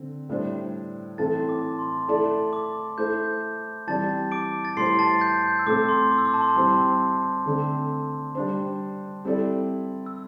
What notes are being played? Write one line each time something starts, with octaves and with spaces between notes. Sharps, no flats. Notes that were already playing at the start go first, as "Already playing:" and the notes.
Already playing: D3 C4
A2 G3 D4 C5
A2 E3 A3 C4 A4 A5 A6
C6
D6
A5
C6
A3 E4 A4 D5 A5
D6
A3 E4 C5 G6
E3 G3 C4 G4 D5 A5 A6
D6 D7
A6
A2 G3 E4 C5 C6 C7
A5 A6
G6
G6
E6
A2 A3 C4 E4 D6
C6
D6
E6
D6
A5
C6
A5
G3 C4 E4 C5 C6
D3 A3 C4
G3 D4 C5
G3 C4 E4 A4 D5
E6